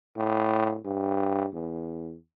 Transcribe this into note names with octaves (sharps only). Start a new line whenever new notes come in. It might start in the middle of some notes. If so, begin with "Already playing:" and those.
A2
G2
E2